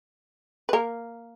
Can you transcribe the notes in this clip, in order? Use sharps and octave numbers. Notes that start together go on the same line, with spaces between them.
B4
A#3 A#4